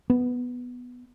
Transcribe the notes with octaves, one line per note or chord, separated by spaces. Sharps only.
B3